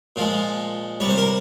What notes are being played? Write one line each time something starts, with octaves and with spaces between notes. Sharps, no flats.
A#2 F3 G#3 F4
C3 G3 C#5
C5
A#4